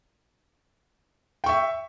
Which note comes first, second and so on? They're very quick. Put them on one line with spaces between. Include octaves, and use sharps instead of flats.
G5 C#6 E5